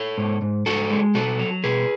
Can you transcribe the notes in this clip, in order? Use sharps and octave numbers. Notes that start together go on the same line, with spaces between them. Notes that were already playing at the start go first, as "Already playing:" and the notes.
Already playing: A4 C#5
G#2
G#2
G#2 F#4 A4
G#3
B2 F#4 A4
F#3
B2 G#4 B4